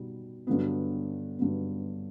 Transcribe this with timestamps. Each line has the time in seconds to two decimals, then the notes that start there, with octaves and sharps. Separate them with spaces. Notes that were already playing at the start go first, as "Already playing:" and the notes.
Already playing: B2 G3 B3 D#4
0.47 G2 D3 F#3 B3
1.38 G2 D3 F#3 B3